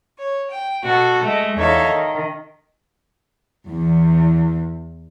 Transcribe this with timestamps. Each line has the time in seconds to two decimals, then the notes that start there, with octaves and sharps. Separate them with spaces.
0.18 C#5
0.50 G5
0.84 B2 F#4 A4
1.23 G#3 A3
1.55 E2 D#4 A4 C#5 E5 F5
1.86 D#3
3.68 E2